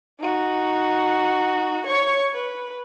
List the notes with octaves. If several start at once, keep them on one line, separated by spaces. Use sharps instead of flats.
D#4 F#4
C#5 C#6
B4